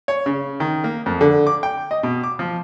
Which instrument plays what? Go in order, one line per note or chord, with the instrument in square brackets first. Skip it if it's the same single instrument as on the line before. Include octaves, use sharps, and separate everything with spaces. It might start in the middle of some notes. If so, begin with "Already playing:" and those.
[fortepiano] C#5
C#3
D#3
A#3
F2
D3
D6
G5
D#5
B2
D6
F3